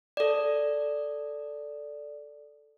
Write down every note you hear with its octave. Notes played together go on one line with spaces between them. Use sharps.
A4 D5